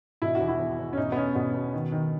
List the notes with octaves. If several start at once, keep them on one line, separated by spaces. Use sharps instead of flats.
B2 E4
F#4
E2
E4
E2
E2
C#4
B2 D#4
B3
B2 C#4
B2 B3
B2
D#3
D#3